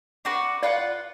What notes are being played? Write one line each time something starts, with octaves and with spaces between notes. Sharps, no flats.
D4 F#4 B4
F4 B4 D5 F#5